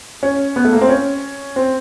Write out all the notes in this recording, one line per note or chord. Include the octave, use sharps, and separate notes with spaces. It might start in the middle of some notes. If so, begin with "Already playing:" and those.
C#4
B3
A3
A#3
C4
C#4
C4